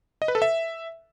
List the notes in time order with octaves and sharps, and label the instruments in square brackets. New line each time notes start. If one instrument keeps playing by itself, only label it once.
[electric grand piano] D#5
B4
A4
E5